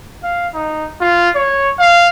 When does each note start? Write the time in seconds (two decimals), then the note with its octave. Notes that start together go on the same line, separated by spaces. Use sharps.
0.23 F5
0.54 D#4
1.01 F4
1.35 C#5
1.79 F5